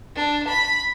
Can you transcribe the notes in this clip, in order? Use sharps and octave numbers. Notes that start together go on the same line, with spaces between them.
D4
B5